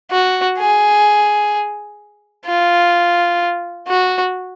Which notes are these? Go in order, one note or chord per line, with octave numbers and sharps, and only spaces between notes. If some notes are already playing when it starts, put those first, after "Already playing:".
F#4
G#4
F4
F#4